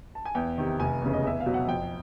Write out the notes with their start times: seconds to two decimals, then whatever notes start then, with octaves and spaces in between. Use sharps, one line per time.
0.15 A5
0.25 G#5
0.35 E2 G5
0.58 C3 D#3
0.80 F1 G#5
1.01 E2 C#3
1.14 D#5
1.23 E2 E5
1.40 F5
1.46 B2 F#3
1.54 F#5
1.68 F2 G5